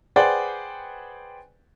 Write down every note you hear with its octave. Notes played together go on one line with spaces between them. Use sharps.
G#4 B4 C5 D5 F#5 G5